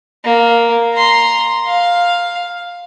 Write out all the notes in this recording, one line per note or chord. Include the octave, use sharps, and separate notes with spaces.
A#3
A#5 C6
F5